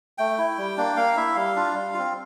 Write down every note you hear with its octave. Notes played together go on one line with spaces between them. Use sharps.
A3 G5
E4
G3
A#3 D4
A#3 F5
E4 E5
G3 F5
D4 F4
G3
C4 F4